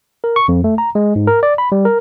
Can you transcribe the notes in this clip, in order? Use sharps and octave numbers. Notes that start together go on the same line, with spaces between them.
A#4
C#6
F2
A3
A#5
G#3
G#2
A#4
D5
B5
G3
A#4